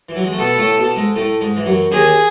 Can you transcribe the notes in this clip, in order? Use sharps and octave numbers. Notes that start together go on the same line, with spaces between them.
E3
F#3
G#3
A3
B2 B3 A4
A2 A3
B2
G#2 G#3
A2 A3
G#2 G#3
E3
F#2 F#3
D#2 D#3 G#4